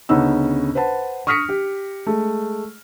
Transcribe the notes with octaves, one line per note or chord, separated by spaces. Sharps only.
D2 C#3 B3 C#4 D#4 E6
B4 C5 F#5 A5
C#6 D#6 F6 A#6 B6 C#7
G4
G#3 A3